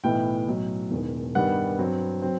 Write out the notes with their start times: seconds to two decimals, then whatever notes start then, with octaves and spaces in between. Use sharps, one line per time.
0.04 B1 A2 E3 B3 G5
0.47 B1 A2 F#3
0.91 E1 E2 D#3
1.35 G2 D#3 G3 B3 F#5
1.79 G2 F#3 C4
2.22 F#3 C4